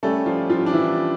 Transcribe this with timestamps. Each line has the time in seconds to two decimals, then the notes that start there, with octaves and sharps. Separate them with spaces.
0.03 G3 A3 C#4 G4 A4
0.26 F3 F4
0.50 F3 F4
0.66 D4
0.73 E3 E4